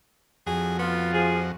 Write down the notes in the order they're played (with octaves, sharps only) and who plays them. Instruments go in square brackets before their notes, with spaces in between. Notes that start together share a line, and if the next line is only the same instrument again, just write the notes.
[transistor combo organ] F2 F#4 [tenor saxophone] G#4
[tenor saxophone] B3 [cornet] F4
[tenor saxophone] F3 [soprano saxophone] G#4